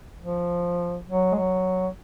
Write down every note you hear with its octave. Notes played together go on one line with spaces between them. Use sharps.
F3
F#3
G#3
F#3